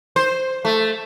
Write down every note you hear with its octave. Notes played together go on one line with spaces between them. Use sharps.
C5
A3